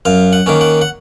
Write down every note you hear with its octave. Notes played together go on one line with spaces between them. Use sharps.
F#2 F5
F#5
D#3 A#3 C#4
F#5
F#5